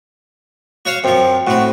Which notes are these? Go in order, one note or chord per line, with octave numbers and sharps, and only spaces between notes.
F#4 C#5 F5
F#2 F3 C4
A2 C4 F#4